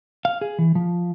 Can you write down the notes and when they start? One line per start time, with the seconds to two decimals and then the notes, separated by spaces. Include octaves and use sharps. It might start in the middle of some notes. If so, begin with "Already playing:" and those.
0.25 F5
0.41 G#4
0.59 E3
0.75 F3